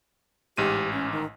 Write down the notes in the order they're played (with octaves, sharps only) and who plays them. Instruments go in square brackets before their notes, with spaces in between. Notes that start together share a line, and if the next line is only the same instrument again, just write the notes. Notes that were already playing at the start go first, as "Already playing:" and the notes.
[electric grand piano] A1 G#2 D#7 [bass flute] G4
[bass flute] C#4
D#3